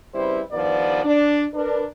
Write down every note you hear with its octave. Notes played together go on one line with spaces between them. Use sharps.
C#3 G3 C4 E4 B4 C5
G2 D#3 F3 B3 D5
D4
D4 A#4 B4